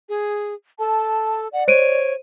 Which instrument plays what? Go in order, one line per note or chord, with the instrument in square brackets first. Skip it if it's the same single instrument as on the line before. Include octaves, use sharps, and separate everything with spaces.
[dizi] G#4
[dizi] A4 [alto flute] A5
[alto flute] D5 [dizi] F#5
[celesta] C5 D7 D#7 [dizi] C#5